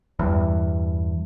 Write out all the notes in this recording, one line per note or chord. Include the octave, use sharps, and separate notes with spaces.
E2 G2